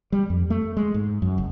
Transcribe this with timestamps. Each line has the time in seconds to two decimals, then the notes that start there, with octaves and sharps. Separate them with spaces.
0.12 G3
0.30 F2
0.50 A3
0.77 G#3
0.94 G#2
1.22 F#2
1.38 F#1